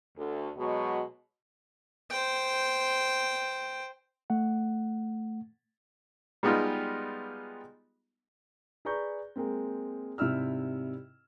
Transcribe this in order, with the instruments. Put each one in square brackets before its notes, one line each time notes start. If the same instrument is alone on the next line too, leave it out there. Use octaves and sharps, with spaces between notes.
[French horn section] D2
B2 F#3 G#3 F#4
[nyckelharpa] C5 G5
[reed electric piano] A3 F#5
[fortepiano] G3 G#3 B3 D#4 F4 G4
[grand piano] G#4 B4 D5 A#5 C#6 G6
G#3 A#3 C4
G#2 C3 G3 E4 E6 F6